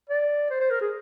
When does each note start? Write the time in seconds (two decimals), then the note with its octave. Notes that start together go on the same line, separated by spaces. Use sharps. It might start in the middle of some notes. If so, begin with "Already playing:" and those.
0.10 D5
0.50 C5
0.60 C5
0.70 A#4
0.81 G#4